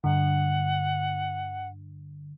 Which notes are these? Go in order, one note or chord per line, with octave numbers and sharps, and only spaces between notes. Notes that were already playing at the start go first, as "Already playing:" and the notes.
G2 D3 F#5